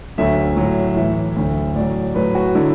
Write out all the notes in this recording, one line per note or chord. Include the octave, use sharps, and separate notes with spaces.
D2 D3 F#3 E5
A2 F#3
A2 E3 E5
D2 D3 F#3
A2 F#3 D5
A2 F#3 B4
F#4
D3 F#3 E4